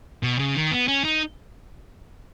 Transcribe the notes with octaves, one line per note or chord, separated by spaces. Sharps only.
B2
C#3
D#3
B3
C#4
D#4